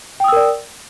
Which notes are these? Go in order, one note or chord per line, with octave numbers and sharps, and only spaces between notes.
A#4 D5 G5 D#6 E6